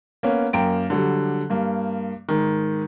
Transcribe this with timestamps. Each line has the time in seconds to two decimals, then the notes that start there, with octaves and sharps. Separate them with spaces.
0.23 A#3 B3 C#4
0.53 F#2 A#3 G5 D7
0.90 D3 F#3 G3
1.50 G2 A#3
2.29 G#2 D#3